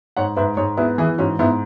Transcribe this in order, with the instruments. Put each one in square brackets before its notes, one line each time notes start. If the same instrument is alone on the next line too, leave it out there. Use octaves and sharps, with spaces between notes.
[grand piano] G#2 [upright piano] C#5 F#5
[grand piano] G#2 [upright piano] B4 E5
[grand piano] G#2 [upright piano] G#4 C#5
[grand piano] B3 [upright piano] E4 G#4
[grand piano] E3 [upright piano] E4 G#4
[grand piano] G#2 [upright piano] C#4 F#4
[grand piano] G#2 [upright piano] B3 E4